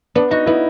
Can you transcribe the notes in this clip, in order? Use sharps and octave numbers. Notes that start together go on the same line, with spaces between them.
B3 D4
D#4 F#4
B3 E4